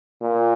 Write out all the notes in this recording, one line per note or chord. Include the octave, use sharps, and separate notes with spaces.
A#2